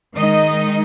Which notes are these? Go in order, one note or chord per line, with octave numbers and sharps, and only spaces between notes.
D#3 G#3 D#4 D#5